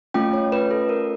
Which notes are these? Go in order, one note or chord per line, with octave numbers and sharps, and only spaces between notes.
A3 C#4 F4 G5
C#5
B4
A4
A#4